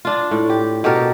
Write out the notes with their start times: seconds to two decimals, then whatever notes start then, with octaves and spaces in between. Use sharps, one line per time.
0.05 D4 F4
0.31 A2
0.50 G4
0.84 B2 G4 A4 A#4